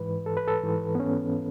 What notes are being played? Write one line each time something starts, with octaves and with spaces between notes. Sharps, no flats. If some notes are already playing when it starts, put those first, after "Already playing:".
Already playing: G#2 E3 B4
A4
B4
A4
G#2 E3
B3
C#4